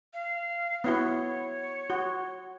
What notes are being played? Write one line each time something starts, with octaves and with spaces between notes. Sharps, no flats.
F5
B3 E4 F#4 C#5
F#4